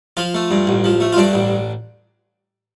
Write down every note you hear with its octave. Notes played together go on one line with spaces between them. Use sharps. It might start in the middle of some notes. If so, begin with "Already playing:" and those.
F3 F4
A3
G2
A1
F3
A3
F4
G2 D4
A1